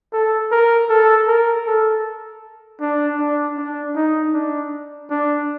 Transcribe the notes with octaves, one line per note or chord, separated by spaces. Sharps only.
A4
A#4
A4
A#4
A4
D4
D4
D4
D#4
D4
D4